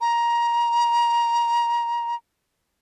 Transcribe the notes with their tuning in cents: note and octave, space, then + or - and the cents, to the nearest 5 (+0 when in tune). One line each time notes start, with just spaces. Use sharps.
A#5 +20